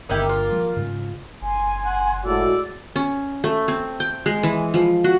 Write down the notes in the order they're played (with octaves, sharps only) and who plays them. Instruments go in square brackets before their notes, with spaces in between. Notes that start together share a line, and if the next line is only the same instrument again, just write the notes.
[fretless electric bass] G1 D3 [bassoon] A#3 [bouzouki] D#4 E4 G4
[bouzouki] F4
[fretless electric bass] F3 G3
G#2 C#3
[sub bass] F#1 [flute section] G#5 C6
[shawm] F#5
[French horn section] A2 G#3 F#4 [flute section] A4 E6 [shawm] D5
[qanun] C#4
A3
C4
G5
G#3
E3
F3
F#4